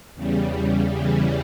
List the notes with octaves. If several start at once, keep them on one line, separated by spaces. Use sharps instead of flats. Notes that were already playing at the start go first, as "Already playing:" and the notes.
E2 C#3 G3
E2 C#3 E3 G3